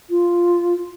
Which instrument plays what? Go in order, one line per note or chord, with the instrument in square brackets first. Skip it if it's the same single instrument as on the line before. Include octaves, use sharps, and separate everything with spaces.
[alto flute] F4